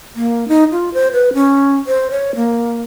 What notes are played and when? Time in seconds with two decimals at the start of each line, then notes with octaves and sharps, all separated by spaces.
0.16 A#3
0.48 D#4
0.72 F4
0.94 C5
1.13 B4
1.34 C#4
1.87 C5
2.11 C#5
2.36 A#3